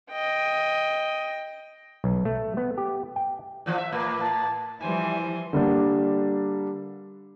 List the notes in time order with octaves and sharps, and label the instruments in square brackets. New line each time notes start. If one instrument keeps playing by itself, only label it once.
[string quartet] D#5 G5
[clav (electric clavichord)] B1
A3
B3
G4
G5
[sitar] A#2 E3 F3
E5
[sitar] A2 A#3 [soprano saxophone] B4
[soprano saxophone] A5
[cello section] E3 F3 G3 [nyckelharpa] C5 G#5
[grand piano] D3 G3 A#3 D4